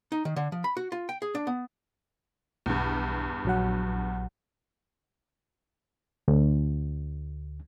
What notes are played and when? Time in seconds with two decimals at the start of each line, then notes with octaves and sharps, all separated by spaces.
0.12 D#4
0.25 D#3
0.36 D3
0.52 F3
0.64 B5
0.77 F#4
0.92 F4
1.09 G5
1.22 G#4
1.35 D4
1.47 B3
2.66 B1 E2 G2
3.45 A#1 F#3 F#5
6.28 D2